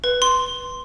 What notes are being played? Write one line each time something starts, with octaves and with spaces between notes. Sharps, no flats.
B4
C6